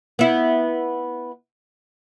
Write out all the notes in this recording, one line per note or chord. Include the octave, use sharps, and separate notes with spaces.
B3 E4